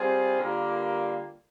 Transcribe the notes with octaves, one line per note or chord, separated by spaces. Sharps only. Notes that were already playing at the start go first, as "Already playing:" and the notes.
Already playing: G3 C4 F4 G#4
D3 G3 A#3 F4